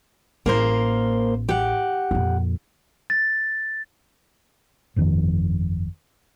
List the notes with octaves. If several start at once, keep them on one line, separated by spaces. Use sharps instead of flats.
A1 A#3 A#4 C5
G4 F#5
F2 A#2
A6
G1 F2 D#3 F3